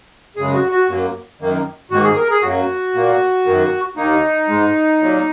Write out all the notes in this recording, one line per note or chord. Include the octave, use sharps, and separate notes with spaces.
F#2 C#3 G#3 G#4
F#4
F#4
F#2 F#3 A#3
F#2 D#3 A#3
G#2 D#3 A#3 F#4
G#4
A#4
G#4
F#2 F#3 A#3 F#4
A#2 A#3
F#2 D#3 A#3
D#2 D#3 A#3 D#4
G#2 G#3
A#2 F#3 A#3